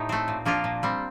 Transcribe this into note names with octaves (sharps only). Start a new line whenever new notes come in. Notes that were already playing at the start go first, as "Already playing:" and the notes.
Already playing: A2 D#4 G4
A3 C4
A#2
F3 A#3 D4 F4
A#2
G3 C4